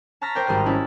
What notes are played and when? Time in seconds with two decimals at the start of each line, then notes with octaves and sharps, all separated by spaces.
0.21 A5 A#5 C#6 F6 A#6 B6
0.35 A#4 C5 D5 G5
0.47 G#1 G3 A#4 D#5 F6
0.66 C#4 E4 A5